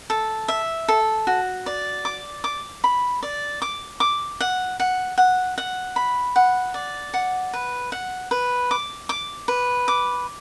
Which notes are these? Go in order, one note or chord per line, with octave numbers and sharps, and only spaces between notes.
A4
E5
A4
F#4
D5
D6
D6
B5
D5
D6
D6
F#5
F#5
F#5
F#5
B5
F#5
D5
F#5
B4
F#5
B4
D6
D6
B4
D6